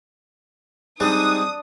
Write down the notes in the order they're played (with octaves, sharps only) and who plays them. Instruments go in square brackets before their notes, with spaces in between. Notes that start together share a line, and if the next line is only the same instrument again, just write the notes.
[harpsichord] G3 G#3 C4 [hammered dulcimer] D4 [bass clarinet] D#4 [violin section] D#6